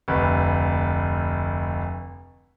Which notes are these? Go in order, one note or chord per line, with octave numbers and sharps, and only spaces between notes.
F1 D2 B4